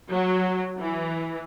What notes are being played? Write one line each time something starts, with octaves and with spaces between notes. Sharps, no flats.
F#3
E3